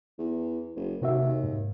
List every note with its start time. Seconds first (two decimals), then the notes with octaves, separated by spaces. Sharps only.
0.18 E2
0.76 F#1
1.02 D#2 C3 F#4 E5
1.21 D#2
1.44 G#2